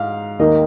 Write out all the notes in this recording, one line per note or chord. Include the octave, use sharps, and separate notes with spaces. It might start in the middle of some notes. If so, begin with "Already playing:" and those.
Already playing: G#2 F5
D#2 D#3 A#3 D#4 D#5